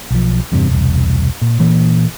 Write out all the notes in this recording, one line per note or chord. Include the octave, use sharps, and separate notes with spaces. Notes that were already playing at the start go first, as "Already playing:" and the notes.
B1 F3
E2 G2 C3
E1 C2
A#2
A#2 E3 A#3